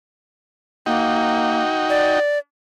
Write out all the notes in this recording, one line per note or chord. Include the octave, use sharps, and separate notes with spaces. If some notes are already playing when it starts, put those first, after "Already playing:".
A#3 D#4 F#4 G5
D5